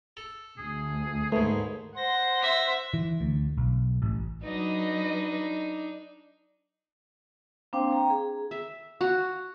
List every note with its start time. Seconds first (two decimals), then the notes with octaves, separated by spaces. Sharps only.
0.17 A4
0.58 D2 G#4
1.32 D#2 G#2 G#3 A3 B4
1.96 C5 F#5 C6 A#6
2.42 E5
2.94 E3
3.21 D2
3.58 B1
4.02 A1
4.43 F#3 D4 D#4 B4 D#5
7.73 A#3 C4 D4 C5 F5 G5
7.91 G5 A#5
8.10 G#4
8.51 E5
9.01 F#4